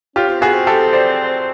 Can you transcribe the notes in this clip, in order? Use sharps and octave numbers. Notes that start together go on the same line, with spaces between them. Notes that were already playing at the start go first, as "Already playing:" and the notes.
C#4 F4 G4
C4
B3 F#4 G#4
C4
G4 A4
C5 D5